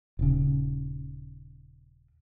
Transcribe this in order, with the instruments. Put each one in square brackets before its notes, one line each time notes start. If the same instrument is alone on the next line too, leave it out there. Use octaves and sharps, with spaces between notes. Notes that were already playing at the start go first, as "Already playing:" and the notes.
[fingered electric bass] D#1 C#3